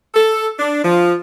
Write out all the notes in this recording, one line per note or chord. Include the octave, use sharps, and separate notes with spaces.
A4
D4
F3